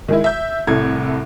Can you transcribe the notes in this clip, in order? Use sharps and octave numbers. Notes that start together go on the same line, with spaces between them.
D#3 G#3 E4
E5 G6
C2 A2 A4 G#6